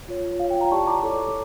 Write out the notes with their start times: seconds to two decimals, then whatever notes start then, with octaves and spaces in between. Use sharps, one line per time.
0.08 F4 C#5
0.40 F4 C#5 F5
0.50 G5
0.61 G5 A#5
0.71 E4 G4 D5 A5 C#6
0.87 A#5 D6
1.03 E4 A4 C#5